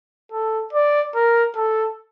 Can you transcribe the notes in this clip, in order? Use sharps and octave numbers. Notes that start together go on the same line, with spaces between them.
A4
D5
A#4
A4